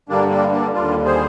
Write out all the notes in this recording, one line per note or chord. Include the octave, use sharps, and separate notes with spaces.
G2 D3 G3 A#3 D4
A#3 D4
A#3 D4
D#2 D3 G3 D4 F4
G#4 C5